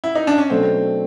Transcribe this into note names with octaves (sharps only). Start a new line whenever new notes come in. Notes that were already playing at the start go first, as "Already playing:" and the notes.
E4
D#4
D4
C#4
B2 F#3 A3 C4 D4